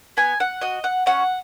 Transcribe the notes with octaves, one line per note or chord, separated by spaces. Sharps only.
B3 G#5
F#5
F#4 D#5
F#5
C#4 F#5